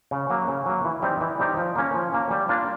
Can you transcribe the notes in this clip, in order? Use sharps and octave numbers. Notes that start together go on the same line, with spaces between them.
C#3
F#3 A#3
C#3
F#3 A#3
E3
G3 C4 D#4 G4
E3
G3 C4 D#4 G4
F3
A#3 C#4
F3
A#3 C#4
G3
A#3 D4 F4